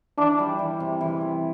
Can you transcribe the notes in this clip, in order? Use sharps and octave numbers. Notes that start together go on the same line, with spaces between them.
E3 D4
G3
E3
C3
E3
C3